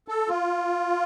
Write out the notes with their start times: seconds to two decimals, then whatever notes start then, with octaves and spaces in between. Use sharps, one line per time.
0.08 A4
0.29 F4